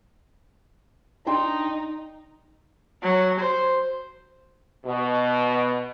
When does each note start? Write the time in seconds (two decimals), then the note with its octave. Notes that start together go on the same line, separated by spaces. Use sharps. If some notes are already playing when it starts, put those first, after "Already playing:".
1.27 D4 D#4 G5 C6
3.03 F#3
3.40 C5
4.86 B2